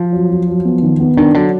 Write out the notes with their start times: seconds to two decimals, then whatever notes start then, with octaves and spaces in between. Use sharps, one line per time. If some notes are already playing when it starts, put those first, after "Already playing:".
Already playing: F3
0.12 F#3
0.29 F4
0.48 F#3
0.65 B3
0.83 D#3
1.00 B3
1.17 D#3 D4
1.34 D3 F#3